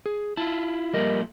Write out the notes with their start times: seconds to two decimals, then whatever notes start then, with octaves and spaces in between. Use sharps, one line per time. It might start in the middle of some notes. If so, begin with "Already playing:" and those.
0.06 G#4
0.37 E4 F4 A5
0.93 F3 G3 A3 A#3 A#4 D#5